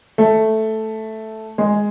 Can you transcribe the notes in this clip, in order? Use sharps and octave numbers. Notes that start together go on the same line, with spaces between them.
A3
G#3